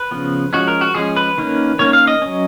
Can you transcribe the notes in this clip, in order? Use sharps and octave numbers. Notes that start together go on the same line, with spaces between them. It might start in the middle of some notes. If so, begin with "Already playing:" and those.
Already playing: B4
C#3 F3 B3
F3 G#3 C#4 F#4
A#4
F#4
F3 G#3 C#4 G#4
B4
D#3 A#3 C#4
D#3 A#3 C#4 C#5
F5
D#5
F#3 C#4